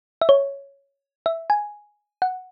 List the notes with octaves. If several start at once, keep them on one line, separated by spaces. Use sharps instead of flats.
E5
C#5
E5
G#5
F#5